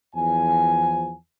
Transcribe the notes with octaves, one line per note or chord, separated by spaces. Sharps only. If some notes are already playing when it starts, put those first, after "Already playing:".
E2 F3 G#5